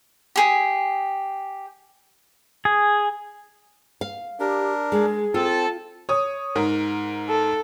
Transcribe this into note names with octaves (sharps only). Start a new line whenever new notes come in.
G4 G#4
G#4
F5
D4 G4 A#4
G#3 G#4
C4 F4 A4
C#5 D#6
G#2 A#4
A4